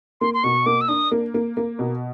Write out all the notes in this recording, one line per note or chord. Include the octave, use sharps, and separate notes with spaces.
A#3 C6
C6
B2 C#6
A#3 D6
E6
D4 D#6
A#3
A#3
A#3
B2